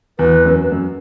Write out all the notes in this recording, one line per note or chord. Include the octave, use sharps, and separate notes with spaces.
E2 B4
F#2
F#2